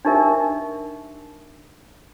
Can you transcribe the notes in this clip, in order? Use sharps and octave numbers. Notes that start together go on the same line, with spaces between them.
D4 D#4 G4 A#4 E5